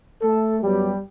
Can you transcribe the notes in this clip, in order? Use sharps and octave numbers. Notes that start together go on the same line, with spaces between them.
A3 A4
F#2 F#3 G3 B3 G4